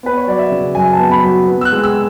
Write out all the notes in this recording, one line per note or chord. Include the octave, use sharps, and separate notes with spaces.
B3 B4
C#5
F#3 D5
E5
C#3
F#2 G#5
A5
B3
B5
F#3
B3
E6
F#6
G#3
E6